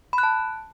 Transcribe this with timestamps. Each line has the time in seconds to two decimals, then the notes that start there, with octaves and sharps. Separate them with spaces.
0.13 B5
0.18 F#6
0.23 A5